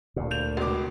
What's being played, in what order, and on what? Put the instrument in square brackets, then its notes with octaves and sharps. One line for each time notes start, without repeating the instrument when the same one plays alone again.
[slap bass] D2 A#2
[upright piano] G6 F7
C#2 B2 D6